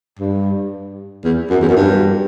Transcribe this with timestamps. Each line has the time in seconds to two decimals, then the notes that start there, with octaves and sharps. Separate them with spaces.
0.19 G2
1.24 E2
1.50 F#2
1.62 E2
1.68 F#2
1.76 G2